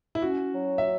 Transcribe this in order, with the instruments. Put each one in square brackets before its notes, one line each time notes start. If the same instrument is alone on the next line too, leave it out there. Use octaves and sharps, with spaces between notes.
[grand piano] E4
[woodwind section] C#4 [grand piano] F#4
[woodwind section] F#3
[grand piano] E5